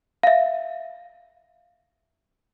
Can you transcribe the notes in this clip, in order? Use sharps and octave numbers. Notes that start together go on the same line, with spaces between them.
E5 F5